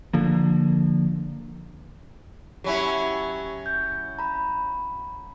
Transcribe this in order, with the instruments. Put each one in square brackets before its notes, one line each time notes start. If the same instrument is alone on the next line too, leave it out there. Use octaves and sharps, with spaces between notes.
[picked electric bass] D3 F3 A#3
[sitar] F#3 C#4 E4 [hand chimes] G4 B5
[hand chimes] G6
A#5 B5